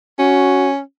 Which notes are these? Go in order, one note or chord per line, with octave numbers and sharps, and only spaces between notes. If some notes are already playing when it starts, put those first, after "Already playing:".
C#4 F#4